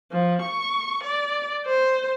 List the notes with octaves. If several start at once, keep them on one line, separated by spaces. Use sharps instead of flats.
F3
C#6
D5
C5